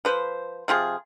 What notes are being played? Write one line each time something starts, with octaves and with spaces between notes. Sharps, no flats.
F3 B4 C5
C3 F3 F4 G#4